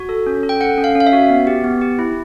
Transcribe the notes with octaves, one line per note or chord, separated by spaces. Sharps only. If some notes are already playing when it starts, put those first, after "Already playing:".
Already playing: F#4
A4
C#4
A4
G5
A4 F#5
C#4
F5
C#4
F5
E5
F#4
B3
G4
B3
G4
E4